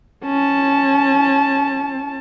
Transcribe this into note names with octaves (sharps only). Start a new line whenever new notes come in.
C#4 A5